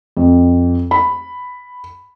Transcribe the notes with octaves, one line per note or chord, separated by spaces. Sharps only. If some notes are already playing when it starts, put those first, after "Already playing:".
F2
B5